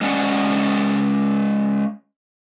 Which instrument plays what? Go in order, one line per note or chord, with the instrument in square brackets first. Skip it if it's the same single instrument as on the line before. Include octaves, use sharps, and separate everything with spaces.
[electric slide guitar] G#3 C#4 D5 F5 F#5